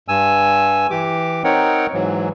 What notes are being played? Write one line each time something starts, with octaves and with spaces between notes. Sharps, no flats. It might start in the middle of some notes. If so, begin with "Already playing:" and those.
G2 G#5 E6
E3 G4 D6
C4 D#4 A#4 C#5 F#5 G5
G#2 E3 F#3